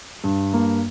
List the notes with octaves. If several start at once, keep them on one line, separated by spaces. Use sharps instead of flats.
G2
A#3